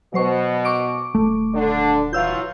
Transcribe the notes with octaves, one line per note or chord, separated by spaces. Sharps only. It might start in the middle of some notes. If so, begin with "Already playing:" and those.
B2 F#3 C5 C#6
C#6 D6 D7
D#1 A3
D3 D4
E3 F#3 F4 F5 E6 G6